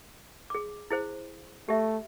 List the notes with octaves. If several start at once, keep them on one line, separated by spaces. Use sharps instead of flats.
G#4 D6
E4 G#4 C5
A3 G4 E5